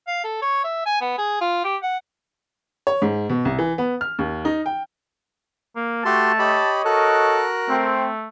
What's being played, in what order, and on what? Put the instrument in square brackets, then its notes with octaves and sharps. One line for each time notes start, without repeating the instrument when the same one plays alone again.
[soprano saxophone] F5
A4
C#5
E5
G#5
B3
G#4
F4
G4
F#5
[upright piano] C#5
G#2
B2
C2
E3
B3
F6
D#2
D#4
G5
[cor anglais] A#3
[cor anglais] A3 [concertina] F#4 G4 C6 [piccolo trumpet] A5
[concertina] G4 B5 [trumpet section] C#5 D#5
[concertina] F#4 F#6 [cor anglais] A4 [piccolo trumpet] A#4
[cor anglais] A3 [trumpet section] C4